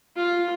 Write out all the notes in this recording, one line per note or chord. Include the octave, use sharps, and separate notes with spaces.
F4